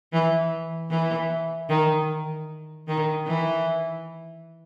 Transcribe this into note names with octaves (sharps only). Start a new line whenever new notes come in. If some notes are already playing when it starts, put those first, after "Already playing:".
E3
E3
D#3
D#3
E3